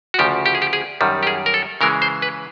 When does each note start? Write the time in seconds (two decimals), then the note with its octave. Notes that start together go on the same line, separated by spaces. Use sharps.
0.14 F#4
0.19 D2 C#3 F3 G4
0.46 G4
0.55 G#4
0.62 G4
0.73 G#4
1.01 F#2 D#3 G3
1.23 G4
1.27 G#4
1.46 A#4
1.54 A4
1.81 C#3 E3 G#3 A#4
2.02 C5
2.22 B4